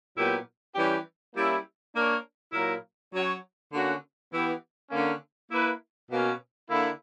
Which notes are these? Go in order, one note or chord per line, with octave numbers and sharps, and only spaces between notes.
A#2 F#3 B3 E4 G4
E3 G3 C#4 G4
G3 A#3 C#4 E4
A#3 D4 A#4 C#5
A#2 F#3 A#3 E4 A#4
F#3 C#4 F#4 C#5
D3 A#3 C#4 F#4
E3 B3 E4 G4
D3 A#3 C#4
A#3 E4 B4
B2 A#3 C#4
D3 A#3 E4